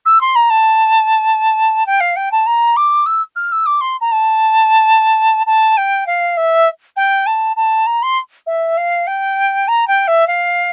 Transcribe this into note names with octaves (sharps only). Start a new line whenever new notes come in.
E6
C6
A#5
A5
G5
F5
G5
A5
A#5
D6
E6
F6
E6
D6
C6
A#5
A5
A5
G5
F5
E5
G5
A5
A5
A#5
C6
E5
F5
G5
A#5
G5
E5
F5